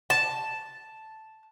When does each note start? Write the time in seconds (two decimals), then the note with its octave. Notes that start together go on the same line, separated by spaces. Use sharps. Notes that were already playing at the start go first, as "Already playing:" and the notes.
0.10 A5